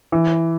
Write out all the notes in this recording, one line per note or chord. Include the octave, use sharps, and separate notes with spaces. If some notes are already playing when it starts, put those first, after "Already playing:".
E3